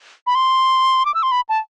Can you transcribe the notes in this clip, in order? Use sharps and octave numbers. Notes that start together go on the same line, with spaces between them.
B5
C6
D6
E6
C6
B5
A5